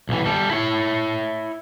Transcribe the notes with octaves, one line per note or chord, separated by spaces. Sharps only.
B1 E3
G3 A4
E4 C#5